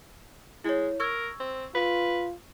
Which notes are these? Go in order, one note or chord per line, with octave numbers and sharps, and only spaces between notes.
G#3 E4 C#5
A#4 C#6 E6 G#6
C4
F4 B4